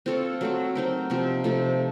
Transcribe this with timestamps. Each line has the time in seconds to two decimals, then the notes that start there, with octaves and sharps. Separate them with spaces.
0.06 C4 F4 A4 C#5
0.41 F#3 A3 C4
0.75 C4 D#4 A#4
1.10 C3 F3 C4
1.44 C3 F3 A3